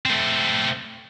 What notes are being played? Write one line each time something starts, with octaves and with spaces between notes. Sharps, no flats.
A3 C4